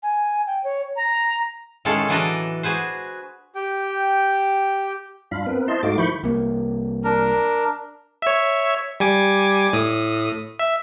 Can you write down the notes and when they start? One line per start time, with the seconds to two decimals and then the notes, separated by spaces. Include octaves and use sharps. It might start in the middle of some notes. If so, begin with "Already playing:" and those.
0.03 G#5
0.47 G5
0.64 C#5
0.96 A#5
1.85 A2 D#3 G#3 C#4 A4 F5
2.09 E3 F#3 D4 B4 D5 D#5
2.63 F#4 G#4 B4 C5
3.55 G4 G5
5.31 G2 D4 F4 F5 B5
5.46 B3 C4 A#4 B4
5.68 E4 C5 D#5 A5 C6
5.83 G#2 A3 D#4 F#4 F5 D6
5.98 D#3 F3 E4 B5 C#6 G6
6.24 C2 A#3
7.04 D4 A#4
8.22 C#5 E5
9.00 G3 G#5 D6
9.73 A2 D#6
10.59 E5